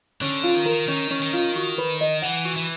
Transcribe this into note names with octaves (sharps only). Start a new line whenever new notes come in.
D3 C#4
F4
D#3
A#4
D#3 C#4
C#4
D#3
F4
F#4
B4
D#5
E3 F#5
F#4
E3